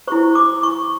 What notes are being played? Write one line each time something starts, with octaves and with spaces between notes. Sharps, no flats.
E4 G4 C5 C#6
D6
C#6